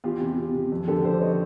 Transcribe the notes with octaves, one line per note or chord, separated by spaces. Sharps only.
E2 F4 G4
C3
C3
C3
F2
D3 G4 A4
F3 C5 D5
C#5 D#5